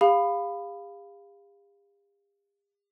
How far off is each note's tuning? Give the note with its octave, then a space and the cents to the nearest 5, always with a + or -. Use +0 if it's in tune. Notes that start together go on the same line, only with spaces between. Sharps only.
G4 +45 F5 +0 B5 +10